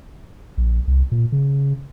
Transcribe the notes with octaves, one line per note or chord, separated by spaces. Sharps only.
A#1
C2
A#2
C#3